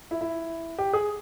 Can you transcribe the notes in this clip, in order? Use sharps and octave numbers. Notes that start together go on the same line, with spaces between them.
E4
E4
G4
G#4